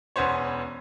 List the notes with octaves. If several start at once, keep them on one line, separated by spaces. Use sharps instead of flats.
E1 B3 C#4 C5 C#5